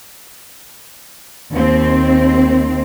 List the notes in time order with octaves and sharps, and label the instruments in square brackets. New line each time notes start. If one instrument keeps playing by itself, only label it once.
[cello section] D#2 C4